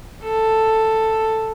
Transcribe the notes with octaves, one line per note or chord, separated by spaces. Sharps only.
A4